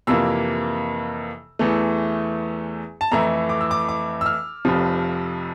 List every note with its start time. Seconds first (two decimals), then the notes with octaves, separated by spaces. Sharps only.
0.07 F2 C3 E3 A#3 F4 E6
1.59 E2 E3 A3
3.01 A5
3.11 F2 E3 A3 E4 A#5
3.49 D6
3.61 E6
3.71 D6
3.89 D6
4.21 E6
4.26 F6
4.65 F1 F2 C3 F3